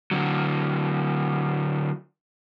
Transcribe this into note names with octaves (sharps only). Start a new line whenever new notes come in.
D3 F#3